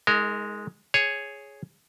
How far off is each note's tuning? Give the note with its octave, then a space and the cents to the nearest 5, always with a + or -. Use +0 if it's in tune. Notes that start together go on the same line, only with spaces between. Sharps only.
G#3 +0 D#4 +35 A#4 -25
G#4 +0 C#5 +0